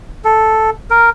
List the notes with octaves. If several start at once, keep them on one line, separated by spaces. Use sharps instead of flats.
A4
A#4